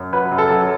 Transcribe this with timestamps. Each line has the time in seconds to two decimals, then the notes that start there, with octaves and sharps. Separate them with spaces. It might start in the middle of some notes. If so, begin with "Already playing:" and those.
Already playing: F#2
0.13 F#3 B4
0.32 F#2
0.38 A4
0.50 F#3